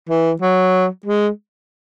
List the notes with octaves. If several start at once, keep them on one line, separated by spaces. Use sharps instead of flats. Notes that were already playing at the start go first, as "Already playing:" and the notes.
E3
F#3
G#3